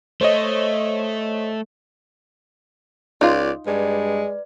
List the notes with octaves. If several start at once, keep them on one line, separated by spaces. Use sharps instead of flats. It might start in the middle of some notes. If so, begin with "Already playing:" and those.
A3 C5 C#5 D#5
C#2 D#4 F4 D5
G2 G#3 B4 D5